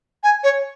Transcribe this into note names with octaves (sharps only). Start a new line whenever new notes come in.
G#5
C#5